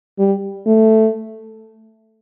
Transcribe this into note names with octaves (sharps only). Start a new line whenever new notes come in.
G3
A3